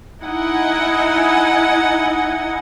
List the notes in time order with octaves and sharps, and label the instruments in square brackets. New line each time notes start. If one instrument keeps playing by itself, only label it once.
[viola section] D#4 E4 D#5 F#5 G#5